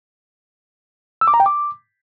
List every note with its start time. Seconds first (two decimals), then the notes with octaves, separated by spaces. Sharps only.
1.21 E6
1.28 D6
1.34 A#5
1.40 G5
1.46 D6